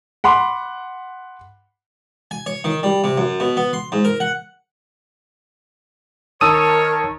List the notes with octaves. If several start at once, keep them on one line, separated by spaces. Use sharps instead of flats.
F#5 B5 C6 D6
G#5
C#5
D#3
G3
C3
F#2
B2
B3
C6
G#2
A#4
F#5
D#3 A#4 C#5 A5 D#6 E6 D#7